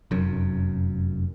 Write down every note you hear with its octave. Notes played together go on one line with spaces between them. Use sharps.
F1 F#2